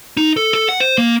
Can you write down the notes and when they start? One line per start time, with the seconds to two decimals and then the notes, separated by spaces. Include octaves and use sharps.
0.17 D#4
0.37 A4
0.54 A4
0.69 F#5
0.80 C5
0.98 A#3